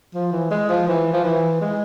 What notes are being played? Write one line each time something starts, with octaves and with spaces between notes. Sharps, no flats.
F3
E3
G#3
F3
E3
F3
E3
G#3